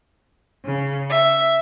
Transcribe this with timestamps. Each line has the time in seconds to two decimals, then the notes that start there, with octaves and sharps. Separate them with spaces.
0.65 C#3
1.09 E5